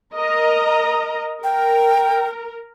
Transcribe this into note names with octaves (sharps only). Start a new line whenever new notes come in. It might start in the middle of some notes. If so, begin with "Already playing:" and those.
A#4 D#5 A#5
A#4 G5